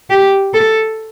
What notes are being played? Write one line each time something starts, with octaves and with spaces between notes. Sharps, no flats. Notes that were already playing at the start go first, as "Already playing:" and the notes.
G4
A4